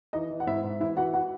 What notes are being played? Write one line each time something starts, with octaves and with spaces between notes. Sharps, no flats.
E3 D#4 D#5
E3
F#5
G#2 E4 E5
G#2
E3 E4 E5
E3 F#4 F#5
F#4 F#5